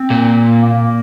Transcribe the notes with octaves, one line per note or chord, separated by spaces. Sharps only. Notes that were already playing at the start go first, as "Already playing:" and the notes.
Already playing: C4
A#2
A#3